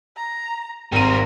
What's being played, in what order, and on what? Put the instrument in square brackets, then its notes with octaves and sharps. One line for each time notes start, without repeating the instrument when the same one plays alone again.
[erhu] A#5
[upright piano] G#1 D#7 [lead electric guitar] G3 C4 [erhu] A#4